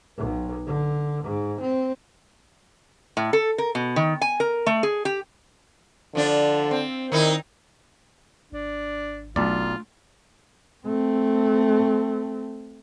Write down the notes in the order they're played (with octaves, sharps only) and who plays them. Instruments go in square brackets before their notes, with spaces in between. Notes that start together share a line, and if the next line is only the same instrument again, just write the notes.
[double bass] B1
D3
G#2
C4
[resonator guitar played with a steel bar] A2
A4
A#4
B2
D#3
G#5
A#4
A3
G#4
G4
[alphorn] D3 [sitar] F3 D4
[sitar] C4
[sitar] D#3 D#4 E4 [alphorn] A#4
[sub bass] G#1 [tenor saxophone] D4
[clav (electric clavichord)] B1 D5 [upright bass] A3 D4 [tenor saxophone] F4
[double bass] A3 C4